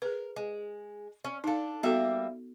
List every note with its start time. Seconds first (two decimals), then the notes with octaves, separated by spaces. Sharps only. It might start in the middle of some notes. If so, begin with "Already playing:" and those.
0.02 G#4 A#4 B4
0.36 G#3
1.24 C#4
1.44 D4 D#4 A4 F5
1.83 G3 A#3 B3 F#4 A4 E5